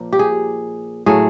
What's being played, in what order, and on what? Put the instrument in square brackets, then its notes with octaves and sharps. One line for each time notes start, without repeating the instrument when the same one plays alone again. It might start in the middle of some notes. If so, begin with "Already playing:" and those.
Already playing: [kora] A#2 F3 A#3
G4
G#4
A2 F#3 A3 G#4